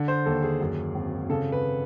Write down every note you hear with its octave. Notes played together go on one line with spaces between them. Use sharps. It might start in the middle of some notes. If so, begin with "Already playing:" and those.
Already playing: D3
C5
D#2 A4
G#4
F#2
G#1
C#3 A4
B4